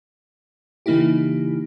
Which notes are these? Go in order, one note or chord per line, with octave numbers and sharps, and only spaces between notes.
C#3 E3 A#3 D#4 E4 G4